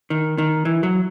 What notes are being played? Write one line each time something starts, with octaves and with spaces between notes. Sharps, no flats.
D#3
D#3
E3
F#3